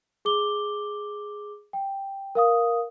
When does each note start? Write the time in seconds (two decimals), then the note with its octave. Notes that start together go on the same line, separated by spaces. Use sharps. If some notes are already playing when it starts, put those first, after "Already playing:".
0.25 G#4 D6 G7
1.73 G5
2.35 A#4 F5 D#6